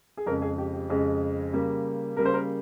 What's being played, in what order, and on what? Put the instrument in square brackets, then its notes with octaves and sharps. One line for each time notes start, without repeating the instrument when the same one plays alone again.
[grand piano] G#4
F2 C#3 G#3 A#4
G#4
G4
G4
F2 C#3 G#3
C#3 G3 A#3
C#3 G3 A#3 A#4
C5
A#4